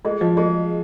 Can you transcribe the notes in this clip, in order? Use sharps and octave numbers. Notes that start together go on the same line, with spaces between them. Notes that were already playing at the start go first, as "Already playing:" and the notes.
G#3 F4 G#4 D#5
F3
G#3 F4 G#4 D#5